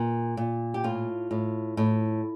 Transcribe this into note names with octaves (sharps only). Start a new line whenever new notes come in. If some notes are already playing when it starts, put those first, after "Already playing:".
Already playing: A#2
A#2
G4
A2 F4
A2
A2